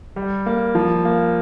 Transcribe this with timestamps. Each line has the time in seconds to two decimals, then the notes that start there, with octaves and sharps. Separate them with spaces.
0.16 G3
0.46 A#3
0.75 F3
1.05 A#3